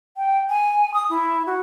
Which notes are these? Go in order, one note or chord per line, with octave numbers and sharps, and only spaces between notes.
G5
G#5
D#6
E4
F#4